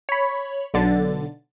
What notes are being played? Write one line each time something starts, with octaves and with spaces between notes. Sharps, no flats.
C#5 B5
B1 D3 A6